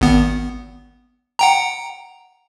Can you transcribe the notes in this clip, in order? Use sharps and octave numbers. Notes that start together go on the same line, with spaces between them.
G#1 B3
F#5 G5 A#5